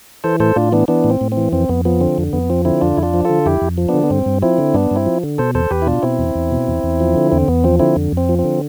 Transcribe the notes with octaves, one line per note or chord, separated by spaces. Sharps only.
E3 A4 C5
A2 A4 C5
A2 D4 F4
E3 B3 D4
E3 B3 D4
A2
C4
A2
C4
E3
F2 C4
F2 B3
F3 B3
D3 C4
F2
F2 B3
F3 C4
D3 C4 E4
F2 D4 F4
F2 E4
D4 F4
F3
D3 F4 A4
F2 E4 G4
F2
F3
D3 B3 D4
B3
G2 C4
G2
F3 C4 E4
D3
G2 B3 D4
G2 C4 E4
F3
D3
B2 A4 C5
E2 A4 C5
E2 G4 B4
E4
B2 D4 F4
B2 C4 E4
E2
E2
B2
E2
E2
F3
D3
E2 C4
E2 B3
F3 C4
D3 C4 E4
F2
F2 C4
F3
C4
D3